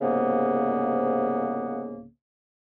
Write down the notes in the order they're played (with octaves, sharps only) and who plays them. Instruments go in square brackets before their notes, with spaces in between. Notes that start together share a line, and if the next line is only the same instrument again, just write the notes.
[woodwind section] C2 G#2 C#3 A#3 B3